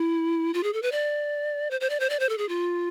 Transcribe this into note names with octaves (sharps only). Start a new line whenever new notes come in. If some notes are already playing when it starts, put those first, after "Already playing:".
Already playing: E4
F4
G#4
A4
B4
D5
C5
C5
D5
C5
D5
C5
A4
G#4
F4